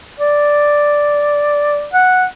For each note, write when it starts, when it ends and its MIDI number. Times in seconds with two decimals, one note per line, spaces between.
0.20 1.86 74
1.93 2.25 78